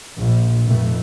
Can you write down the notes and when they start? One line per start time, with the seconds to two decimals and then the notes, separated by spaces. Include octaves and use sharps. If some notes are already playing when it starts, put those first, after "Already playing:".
0.18 A#1
0.65 F1 F2 A3